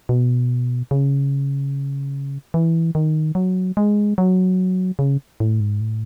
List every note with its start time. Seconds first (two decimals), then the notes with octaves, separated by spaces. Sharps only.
0.09 B2
0.91 C#3
2.54 E3
2.95 D#3
3.35 F#3
3.77 G#3
4.18 F#3
4.99 C#3
5.40 A2
5.60 G#2
5.81 A2